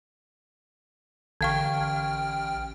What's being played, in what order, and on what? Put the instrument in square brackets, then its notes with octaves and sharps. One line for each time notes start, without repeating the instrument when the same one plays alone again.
[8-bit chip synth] A1 G5 F6 [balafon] D3 F5 C#6